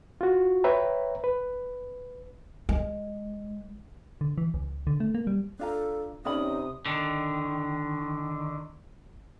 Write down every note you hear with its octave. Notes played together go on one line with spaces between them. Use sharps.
F4 F#4
B4 C#5 E5 G5 A#5
B4
G#3
D3
E3
C#2
D3
A3
A#3
G3
D4 F4 A4 A#5
C3 C#4 D#4 D5 B5 D#6
D3 D#3